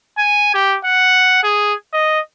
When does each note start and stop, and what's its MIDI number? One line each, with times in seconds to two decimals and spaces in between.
0.18 0.53 80
0.54 0.77 67
0.85 1.40 78
1.43 1.74 68
1.93 2.20 75